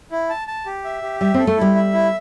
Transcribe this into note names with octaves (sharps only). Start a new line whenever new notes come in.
E4
A5
A5
G4
E5
G4
G3 E5
C4 A4
A3
G3 E4
E5
E4